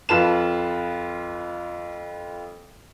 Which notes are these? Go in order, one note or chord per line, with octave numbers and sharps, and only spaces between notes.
F2 F4 B4 A5 E7